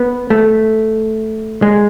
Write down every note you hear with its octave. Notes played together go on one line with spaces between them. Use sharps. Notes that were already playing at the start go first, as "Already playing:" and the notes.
Already playing: B3
A3
G#3